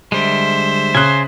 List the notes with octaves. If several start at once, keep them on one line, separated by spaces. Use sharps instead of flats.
D3 G3 G#3 C5 E5
C#3 G#5 C6 F#6